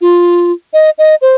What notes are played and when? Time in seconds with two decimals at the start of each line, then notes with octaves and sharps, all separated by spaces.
0.01 F4
0.73 D#5
0.98 D#5
1.22 C5